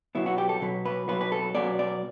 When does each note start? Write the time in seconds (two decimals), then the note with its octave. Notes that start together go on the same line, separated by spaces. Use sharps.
0.15 B1 B2 F#3 B3 E4
0.26 F#4
0.38 G4
0.49 A4
0.61 B1 B2 F#3 B3
0.85 B4
1.08 B1 B2 F#3 B3 B4
1.21 B4
1.32 A4
1.55 B1 B2 F#3 B3 D5
1.79 D5